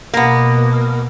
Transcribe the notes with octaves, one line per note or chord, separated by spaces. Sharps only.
B2 A#3 B3